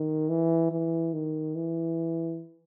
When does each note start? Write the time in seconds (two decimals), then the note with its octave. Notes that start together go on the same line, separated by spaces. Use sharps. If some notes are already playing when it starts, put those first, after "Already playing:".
Already playing: D#3
0.29 E3
0.71 E3
1.13 D#3
1.55 E3